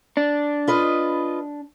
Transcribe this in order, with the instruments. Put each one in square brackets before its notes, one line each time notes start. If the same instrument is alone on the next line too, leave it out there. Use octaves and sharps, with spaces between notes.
[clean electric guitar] D4
[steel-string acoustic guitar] F4 B4 D#5